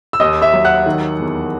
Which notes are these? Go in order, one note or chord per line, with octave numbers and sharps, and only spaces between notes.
E6
D#2 D#5 D#6
E5 E6
F#3
F#5 F#6
D#3
E2